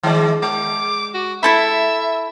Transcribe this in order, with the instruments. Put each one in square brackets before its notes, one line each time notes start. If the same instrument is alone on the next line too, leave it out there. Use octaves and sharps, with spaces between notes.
[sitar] D#3 G#3 D5
[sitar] G#3 [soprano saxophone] D6
[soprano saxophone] F#4
[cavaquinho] E4 A4 B5 [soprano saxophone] E5